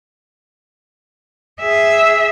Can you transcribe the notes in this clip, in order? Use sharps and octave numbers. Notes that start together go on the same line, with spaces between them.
G#4 E5